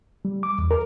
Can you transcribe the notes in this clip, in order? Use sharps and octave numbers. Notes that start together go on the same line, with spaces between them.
G3
D6
E2
A#4